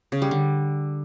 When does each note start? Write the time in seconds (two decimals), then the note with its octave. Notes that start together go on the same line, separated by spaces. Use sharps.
0.12 C#3
0.22 G3
0.31 D3